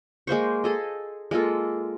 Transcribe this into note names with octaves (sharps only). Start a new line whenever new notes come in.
G#3 A#3 C5 C#6
G#4 A4 D#5
G#3 A#3 F4 A4